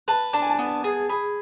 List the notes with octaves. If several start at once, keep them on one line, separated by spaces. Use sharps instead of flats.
B4 A5
D4 A5
G#5
A5
B3
G#4
G#4 B5